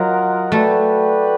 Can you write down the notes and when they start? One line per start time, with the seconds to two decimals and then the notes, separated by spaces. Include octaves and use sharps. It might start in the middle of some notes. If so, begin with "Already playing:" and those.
Already playing: F#3 F4 A#4 D#5 F#5
0.52 A3 F#4 B4 D5 G5